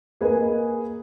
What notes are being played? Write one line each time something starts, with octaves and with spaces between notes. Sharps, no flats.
A#3 G#4 B4 D#5 G#5